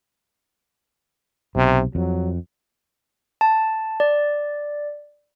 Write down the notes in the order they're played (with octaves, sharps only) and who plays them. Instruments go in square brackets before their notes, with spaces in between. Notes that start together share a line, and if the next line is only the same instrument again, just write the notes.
[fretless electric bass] B1 [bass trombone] C3
[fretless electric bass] F2 [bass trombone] F#3
[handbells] A5
D5